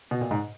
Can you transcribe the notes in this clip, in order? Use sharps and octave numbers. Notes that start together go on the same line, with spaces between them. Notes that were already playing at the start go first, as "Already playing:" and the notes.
B2
A#2
G#2